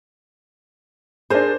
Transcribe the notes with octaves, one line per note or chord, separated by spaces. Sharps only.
D4 G#4 A#4 C5